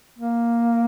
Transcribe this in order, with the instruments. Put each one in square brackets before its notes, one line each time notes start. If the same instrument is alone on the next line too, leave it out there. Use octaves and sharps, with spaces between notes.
[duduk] A#3